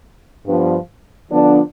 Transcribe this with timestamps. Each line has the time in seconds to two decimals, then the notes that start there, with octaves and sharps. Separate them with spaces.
0.46 G2 F3 B3
1.30 D3 F3 B3 D4